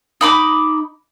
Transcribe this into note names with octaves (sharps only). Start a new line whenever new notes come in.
D#4 B5 D6